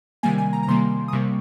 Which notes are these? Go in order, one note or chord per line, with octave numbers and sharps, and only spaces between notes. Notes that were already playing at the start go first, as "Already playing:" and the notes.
C3 D#3 G3 A#3 G#5
G#5
A#5
A#5
C3 D#3 G3 A#3 C6
D#6
C3 G3 A#3 C#6